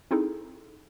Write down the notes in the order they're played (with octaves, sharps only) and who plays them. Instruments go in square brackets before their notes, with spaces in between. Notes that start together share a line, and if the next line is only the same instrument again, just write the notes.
[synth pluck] C4 D#4 E4 G#4 A4